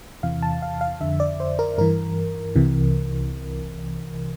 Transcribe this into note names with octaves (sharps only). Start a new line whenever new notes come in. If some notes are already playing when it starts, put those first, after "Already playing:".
E2 C3 E3 F5
A5
F5
F5
F2 D3 E5
D5
C5
A#4
G2 E3 A#4
C2 C3 E3